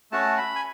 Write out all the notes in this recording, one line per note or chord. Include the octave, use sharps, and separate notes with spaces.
A3 C#4 F#4 A5
B5
G#5